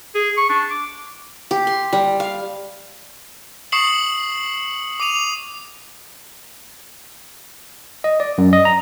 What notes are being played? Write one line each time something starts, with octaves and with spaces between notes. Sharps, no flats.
G#4
C#6
D4
D6
G4
C6
G3
F5
C#6 D#6 C7 C#7 F#7
D6 D#7 F7
D#5
D5
F#2
D#5
A#5